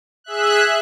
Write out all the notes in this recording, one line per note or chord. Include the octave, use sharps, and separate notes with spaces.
G#4 E5 F#6